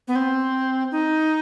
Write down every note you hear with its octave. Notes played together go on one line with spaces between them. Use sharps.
B3
C4
D#4